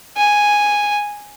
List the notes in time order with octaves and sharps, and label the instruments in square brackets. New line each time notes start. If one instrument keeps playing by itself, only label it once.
[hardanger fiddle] G#5